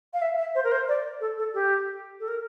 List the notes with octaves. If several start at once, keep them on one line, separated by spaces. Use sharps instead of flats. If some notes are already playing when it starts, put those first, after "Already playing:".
F5
E5
E5
C5
A#4
C5
D5
A4
A4
G4
A4
A#4